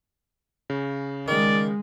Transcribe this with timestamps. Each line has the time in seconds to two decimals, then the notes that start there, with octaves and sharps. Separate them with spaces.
0.70 C#3
1.28 D#3 G#3 D5